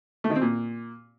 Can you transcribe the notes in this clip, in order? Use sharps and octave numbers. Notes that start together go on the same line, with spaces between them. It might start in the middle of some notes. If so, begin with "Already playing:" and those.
A3
D#3
C4
A#2